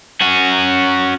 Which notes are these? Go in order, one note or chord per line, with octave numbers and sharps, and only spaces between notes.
C#4 F#4